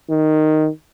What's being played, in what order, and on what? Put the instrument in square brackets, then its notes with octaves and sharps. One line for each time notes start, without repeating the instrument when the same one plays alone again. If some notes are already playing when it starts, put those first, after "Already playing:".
[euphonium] D#3